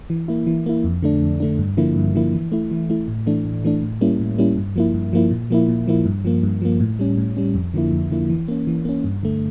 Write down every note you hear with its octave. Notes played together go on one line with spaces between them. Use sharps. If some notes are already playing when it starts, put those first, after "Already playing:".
E3
A#3 E4
E3
A#3 E4
F2
D3 A3 D4
F2
D3 A3 D4
G2
D3 F3 A#3 E4
G2
D3 F3 A#3 E4
E3
A3 E4
E3
A3 E4
A2
E3 A3 D4
A2
E3 A3 D4
A2
G3 A#3 C#4 E4
A2
G3 A#3 C#4 E4
G2
F3 A#3 E4
G2
F3 A#3 E4
A#2
F3 A#3 E4
A#2
F3 A#3 E4
G2
F3 A#3
G2
F3 A#3
A2
G3 C#4
A2
G3 C#4
F2
D3 F3 A#3 E4
F2
D3 F3 A#3 E4
E3
A#3 C#4
E3
A#3 C#4
G2
D3 A3